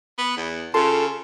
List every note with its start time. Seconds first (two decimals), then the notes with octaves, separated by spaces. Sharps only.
0.18 B3
0.36 E2
0.74 C#3 F4 A4 C6